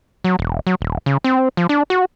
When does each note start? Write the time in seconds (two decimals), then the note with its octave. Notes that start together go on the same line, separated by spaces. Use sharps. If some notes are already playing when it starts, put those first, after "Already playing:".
0.24 F#3
0.39 E1
0.67 F#3
0.81 D#1
1.06 C#3
1.24 C4
1.57 F3
1.69 D4
1.90 F#4